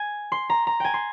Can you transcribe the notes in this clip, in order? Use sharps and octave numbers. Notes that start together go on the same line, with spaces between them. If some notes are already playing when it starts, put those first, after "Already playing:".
Already playing: G#5
C6
A#5
A#5
G5 G#5
C6